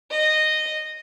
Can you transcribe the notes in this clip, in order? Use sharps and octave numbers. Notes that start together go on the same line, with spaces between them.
D#5